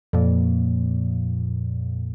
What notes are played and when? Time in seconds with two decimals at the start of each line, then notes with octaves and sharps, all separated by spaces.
0.13 F2 A#2